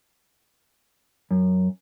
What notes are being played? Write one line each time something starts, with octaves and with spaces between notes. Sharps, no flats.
F#2